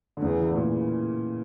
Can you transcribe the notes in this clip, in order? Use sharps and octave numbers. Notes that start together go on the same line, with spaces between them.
D3
E2 C#3
E3
A2
A#2